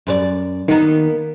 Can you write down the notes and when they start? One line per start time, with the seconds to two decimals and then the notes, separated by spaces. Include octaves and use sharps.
0.07 F#2 B4 D5
0.68 D#3 A#3 B3 D#4